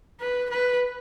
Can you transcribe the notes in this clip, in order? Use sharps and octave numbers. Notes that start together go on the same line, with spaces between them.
B4
B4